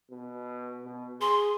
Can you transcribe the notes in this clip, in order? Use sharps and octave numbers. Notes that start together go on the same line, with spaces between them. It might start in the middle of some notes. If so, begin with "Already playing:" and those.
B2
B2
G#4 C6